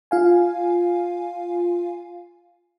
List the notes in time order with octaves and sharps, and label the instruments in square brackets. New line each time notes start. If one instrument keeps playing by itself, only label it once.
[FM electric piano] F4 F5 G#5